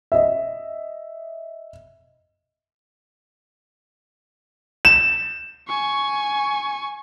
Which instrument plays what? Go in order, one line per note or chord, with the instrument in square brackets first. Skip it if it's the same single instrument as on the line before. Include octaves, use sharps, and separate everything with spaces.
[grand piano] D#5 E5
E7
[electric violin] G#5 C#6